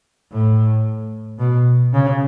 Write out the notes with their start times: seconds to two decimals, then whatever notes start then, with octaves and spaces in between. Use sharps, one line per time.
0.32 A2
1.39 B2
1.93 C#3